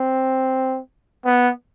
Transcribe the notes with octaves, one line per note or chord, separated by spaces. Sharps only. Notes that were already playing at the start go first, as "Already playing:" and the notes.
Already playing: C4
B3